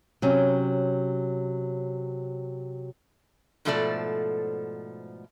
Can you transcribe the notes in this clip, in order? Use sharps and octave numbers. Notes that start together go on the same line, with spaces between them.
C3 F#3 C#4
G#2 B2 F3 A3 A4 D5